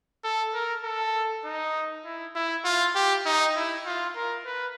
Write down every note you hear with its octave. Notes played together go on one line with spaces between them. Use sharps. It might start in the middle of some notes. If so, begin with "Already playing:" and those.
A4
A#4
A4
D#4
E4
E4
F4
G4
D#4
E4
F4
A#4
B4